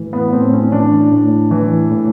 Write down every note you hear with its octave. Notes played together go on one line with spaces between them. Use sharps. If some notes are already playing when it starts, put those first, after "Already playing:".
Already playing: A2 E3
B3
A2 C4
C#4
E3 D4
A2
E3
A2